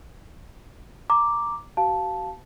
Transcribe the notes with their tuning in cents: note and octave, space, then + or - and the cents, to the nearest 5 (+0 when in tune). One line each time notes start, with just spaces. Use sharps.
A#5 +0 D6 +0
F#4 +45 F5 +5 A5 -5